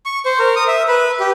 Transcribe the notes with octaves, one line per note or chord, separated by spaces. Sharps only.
C#6
C5
A#4
D#6
E5
B4
G4